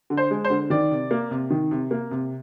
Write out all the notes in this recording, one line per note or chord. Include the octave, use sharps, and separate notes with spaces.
D3
C5
G#3
C5
D3
D#3 D5
C3
A#3
C3
D#3
C3
A#3
C3